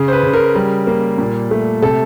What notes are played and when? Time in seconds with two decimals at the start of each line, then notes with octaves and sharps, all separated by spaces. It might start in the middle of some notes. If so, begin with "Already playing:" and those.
Already playing: C#3
0.08 C5
0.12 B4
0.23 C#3
0.33 A#4
0.55 G3 A#4
0.87 A#3
1.18 A#2
1.51 A3
1.82 C3 A4